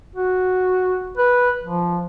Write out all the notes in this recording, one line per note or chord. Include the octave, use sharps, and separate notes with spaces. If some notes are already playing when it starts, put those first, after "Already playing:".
F#4
B4
F3